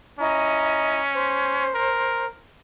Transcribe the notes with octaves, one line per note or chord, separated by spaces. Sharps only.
C#4 E4 D#5 A#5
C5
A#4